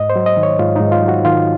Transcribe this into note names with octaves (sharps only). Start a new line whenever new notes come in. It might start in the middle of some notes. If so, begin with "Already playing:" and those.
Already playing: G#2 D#5
C5
F#3
D#5
D#3
C#5
G#2 F4
D#4
G#2
F4
F#3
F#4
D#3 F4